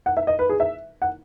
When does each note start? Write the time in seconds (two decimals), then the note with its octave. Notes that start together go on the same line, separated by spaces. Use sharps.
0.06 F#5
0.17 E5
0.27 D#5
0.39 B4
0.49 G#4
0.60 E5
1.02 F#5